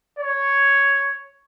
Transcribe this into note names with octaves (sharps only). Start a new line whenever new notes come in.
C#5